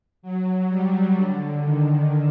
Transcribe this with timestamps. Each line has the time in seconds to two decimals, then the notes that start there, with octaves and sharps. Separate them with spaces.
0.22 F#3
0.68 G3
1.15 D3
1.61 D#3